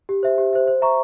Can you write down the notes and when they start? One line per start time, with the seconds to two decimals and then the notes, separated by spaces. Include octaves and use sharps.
0.09 G4
0.23 C5 E5
0.38 G4
0.53 C5 E5
0.67 C5
0.82 E5 A#5 C#6